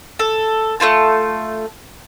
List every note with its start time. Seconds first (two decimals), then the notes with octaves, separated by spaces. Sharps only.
0.19 A4
0.80 A3 C#4 F4 A5